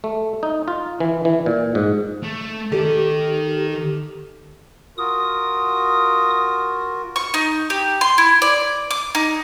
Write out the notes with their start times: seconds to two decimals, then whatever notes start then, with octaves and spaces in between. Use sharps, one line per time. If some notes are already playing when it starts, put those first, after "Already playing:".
0.04 A3
0.43 D#4
0.68 F4
1.00 E3
1.25 E3
1.46 A#2
1.75 G#2
2.23 A3
2.72 D#3 G4 A4
4.98 F4 F#4 A#4 D#6
7.16 C#6
7.34 D#4
7.70 G4
8.01 C6
8.18 E4
8.42 D5
8.91 D6
9.15 D#4